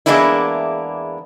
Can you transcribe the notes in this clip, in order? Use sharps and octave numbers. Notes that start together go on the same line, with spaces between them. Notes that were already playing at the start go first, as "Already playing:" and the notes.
E2 G#3 A#3 B3 D4 E4